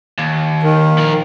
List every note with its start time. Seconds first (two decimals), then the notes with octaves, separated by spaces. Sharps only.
0.19 D#2
0.63 D#3
0.98 F3 A#4